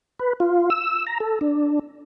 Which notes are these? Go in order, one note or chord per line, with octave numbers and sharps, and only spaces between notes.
B4
F4
E6
A#5
A4
D4